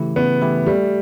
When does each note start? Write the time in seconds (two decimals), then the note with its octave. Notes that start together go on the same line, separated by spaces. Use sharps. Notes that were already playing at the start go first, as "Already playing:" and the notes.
Already playing: C#3 E3 A3 E4 G4
0.16 C#3 B3
0.41 E3 A3 E4 G4
0.66 G3 A3